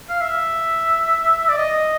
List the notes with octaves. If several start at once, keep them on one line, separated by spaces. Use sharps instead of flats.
F5
E5
D5
D#5